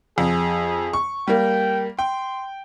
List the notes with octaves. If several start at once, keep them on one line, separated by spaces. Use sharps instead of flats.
F2 G#4
C#6
G3 A#3 G5
G5 C6